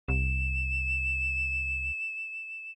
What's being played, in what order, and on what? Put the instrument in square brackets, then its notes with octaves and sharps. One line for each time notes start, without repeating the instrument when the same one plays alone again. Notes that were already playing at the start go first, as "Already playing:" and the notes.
[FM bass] C2 [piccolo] E7